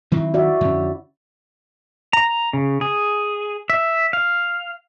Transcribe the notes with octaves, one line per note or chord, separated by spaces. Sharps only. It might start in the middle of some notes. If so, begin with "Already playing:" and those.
D#3 F#3 C4 E4
F#4 D5 E5
F2 D3 C#4
A#5
C#3
G#4
E5
F5